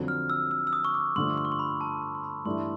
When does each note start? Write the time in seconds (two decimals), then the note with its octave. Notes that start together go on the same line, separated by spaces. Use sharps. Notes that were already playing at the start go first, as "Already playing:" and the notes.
Already playing: F2 D3 F#3
0.08 F6
0.30 E6
0.51 E6
0.67 E6
0.73 D#6
0.84 C#6
0.94 D6
1.16 G2 D3 F3 A3 C6
1.38 C6
1.45 C#6
1.52 C6
1.59 B5
1.81 A5
2.02 A5
2.15 C6
2.24 B5
2.45 G2 E3 A3 D4 C6